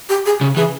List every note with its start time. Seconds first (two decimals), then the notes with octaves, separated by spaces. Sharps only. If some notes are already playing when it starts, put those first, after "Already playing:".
0.09 G4
0.26 G#4
0.41 C#3
0.56 E3 G#4